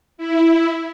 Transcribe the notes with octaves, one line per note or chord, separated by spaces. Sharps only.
E4